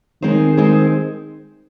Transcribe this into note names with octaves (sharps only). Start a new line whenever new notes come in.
D#3 G#3 C4 D#4 G#4 C5
G#3 C4 D#4 G#4 C5